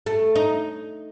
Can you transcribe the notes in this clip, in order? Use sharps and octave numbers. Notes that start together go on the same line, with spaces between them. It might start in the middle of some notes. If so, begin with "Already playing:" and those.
A3
D#4